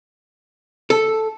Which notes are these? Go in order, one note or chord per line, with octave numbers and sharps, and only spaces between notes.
A4